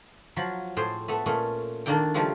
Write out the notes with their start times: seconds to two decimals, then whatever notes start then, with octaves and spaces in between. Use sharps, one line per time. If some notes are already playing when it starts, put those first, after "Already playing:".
0.36 F3 F#3 B5
0.77 A2 G#4 C5 G5
1.08 A3 B3 E5
1.26 A#2 A3 C#4
1.86 D#3 A3 A#3 D4 E4 G5
2.14 C#3 F3 G3 A3 F4